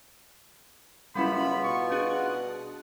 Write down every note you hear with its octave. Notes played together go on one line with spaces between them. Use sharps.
F#1 G3 B3 C#4 E4 F4 B5
B2 C#6
D4 F#4 G#4 F#6